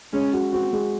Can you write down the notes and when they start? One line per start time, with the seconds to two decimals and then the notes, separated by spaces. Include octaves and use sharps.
0.13 G#3 C#4
0.33 F#4
0.53 C4 F#4
0.73 G#3